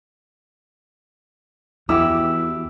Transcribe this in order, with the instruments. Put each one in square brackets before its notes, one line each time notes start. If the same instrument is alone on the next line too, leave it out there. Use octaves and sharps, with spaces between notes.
[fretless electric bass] E2 [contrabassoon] E3 [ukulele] E4 F#4 G4 [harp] E6